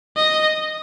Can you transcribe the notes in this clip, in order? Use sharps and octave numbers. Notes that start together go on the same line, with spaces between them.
D#5